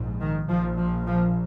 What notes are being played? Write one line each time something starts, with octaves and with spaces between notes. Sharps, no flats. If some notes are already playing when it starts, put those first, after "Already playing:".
Already playing: A#1 G#2
D#3
A#1 A#2 F3
F3
F3